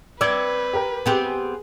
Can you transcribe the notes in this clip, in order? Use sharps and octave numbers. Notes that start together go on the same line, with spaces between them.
C4 B4 D5 E6 G#6 C#7
G4 A#4
B3 C4 G4 G#4